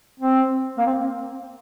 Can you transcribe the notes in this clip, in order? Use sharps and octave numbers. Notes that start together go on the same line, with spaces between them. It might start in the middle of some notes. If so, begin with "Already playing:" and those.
C4
A#3
C4